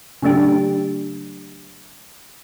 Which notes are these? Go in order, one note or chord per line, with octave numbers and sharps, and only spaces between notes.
C#3 F#3 A3 D4 G4